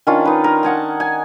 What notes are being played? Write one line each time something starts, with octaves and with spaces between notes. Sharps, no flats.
D#3 C#4 D4 F4
D#4 B4
A#4
D#5 F#5 G#5 A5
G#5